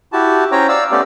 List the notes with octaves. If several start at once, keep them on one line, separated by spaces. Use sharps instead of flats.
E4 F#4 G4 A5
C#4 C5 C#5 G5 A#5
D5 F5 E6
A3 B3 C#4 G4 D5